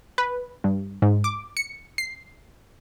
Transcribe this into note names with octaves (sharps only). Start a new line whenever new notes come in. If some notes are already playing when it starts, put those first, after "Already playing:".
B4
G2
G#2
D6
C#7
C7